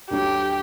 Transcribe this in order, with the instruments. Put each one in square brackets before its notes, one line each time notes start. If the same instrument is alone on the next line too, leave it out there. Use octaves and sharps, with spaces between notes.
[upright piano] D2 D3 F#3 [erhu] G4